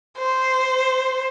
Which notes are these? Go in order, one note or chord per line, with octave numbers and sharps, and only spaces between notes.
C5